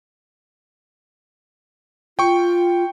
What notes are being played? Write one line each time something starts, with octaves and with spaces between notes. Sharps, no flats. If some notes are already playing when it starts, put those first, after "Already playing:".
F4 G5 C#6